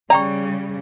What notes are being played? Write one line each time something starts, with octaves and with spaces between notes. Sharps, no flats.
C#3 G3 D5 G5 A#5 C#6